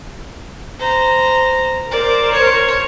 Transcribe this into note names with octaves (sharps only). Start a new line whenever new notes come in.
C5 A#5
A#4 C5 D5
C#5